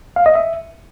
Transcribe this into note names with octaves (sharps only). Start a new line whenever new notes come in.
F5
D#5
E5